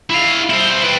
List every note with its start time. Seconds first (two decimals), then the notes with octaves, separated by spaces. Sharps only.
0.10 E4 F5
0.50 E4 C5
0.83 B4 G5